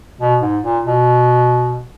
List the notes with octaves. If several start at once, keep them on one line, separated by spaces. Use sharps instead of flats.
B2
G#2
A#2
B2